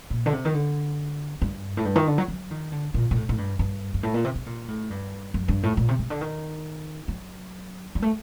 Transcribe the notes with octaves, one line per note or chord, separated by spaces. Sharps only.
A#2
D3
C3
D#3
D3
G2
A2
G2
D#3
D3
F#3
F#3
D#3
D3
A#2
A#2
A2
A2
G2
G2
G2
A2
A#2
C3
C3
A#2
A2
G2
F#2
G2
A2
A#2
C3
C3
D3
D#3
F#3
G3
A3